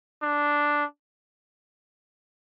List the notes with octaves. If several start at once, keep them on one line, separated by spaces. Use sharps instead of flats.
D4